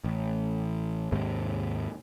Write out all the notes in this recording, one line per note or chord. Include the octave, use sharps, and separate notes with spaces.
A1
D#2 G#2 C3